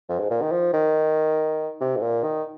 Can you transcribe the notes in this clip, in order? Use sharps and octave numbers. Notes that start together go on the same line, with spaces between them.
F2
G#2
A#2
D#3
F3
D#3
C3
G#2
A#2
D#3